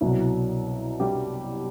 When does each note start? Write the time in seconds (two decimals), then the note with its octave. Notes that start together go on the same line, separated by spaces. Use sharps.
0.01 C2 B2 F#3 E4
1.00 G3 G4